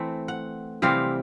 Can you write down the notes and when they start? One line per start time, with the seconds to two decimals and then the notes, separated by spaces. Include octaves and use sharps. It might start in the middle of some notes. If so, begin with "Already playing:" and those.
Already playing: E3 A3 C4
0.28 F#5
0.82 C3 E3 G3 C4 F5